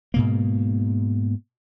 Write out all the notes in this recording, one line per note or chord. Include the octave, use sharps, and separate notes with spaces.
G#2 B2 A#3